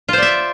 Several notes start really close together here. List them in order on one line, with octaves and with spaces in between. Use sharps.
F4 C5 D5 E5